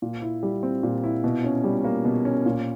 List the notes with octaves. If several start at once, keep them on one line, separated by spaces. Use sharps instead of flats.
A#2
E4
G3
C4
A#2
E4
B2
C#4
G3
A#3
B2
C#4
A#2